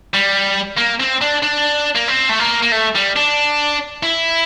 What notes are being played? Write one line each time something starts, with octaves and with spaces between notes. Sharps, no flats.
G3
A#3
C4
D4
D4
A#3
C4
A3
A#3
A#3
A3
G3
D4
E4